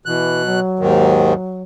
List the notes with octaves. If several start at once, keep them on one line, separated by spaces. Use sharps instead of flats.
B2 E3 F#6
F#3
D#2 G#2 D#3